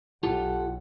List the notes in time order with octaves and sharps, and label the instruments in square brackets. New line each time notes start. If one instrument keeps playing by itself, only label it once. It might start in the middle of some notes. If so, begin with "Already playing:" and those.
[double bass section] B1 [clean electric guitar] F4 G4 A4 [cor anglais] F#5